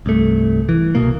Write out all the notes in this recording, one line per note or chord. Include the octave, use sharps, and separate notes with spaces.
C2 G2 A3
E3
C2 B2 A#3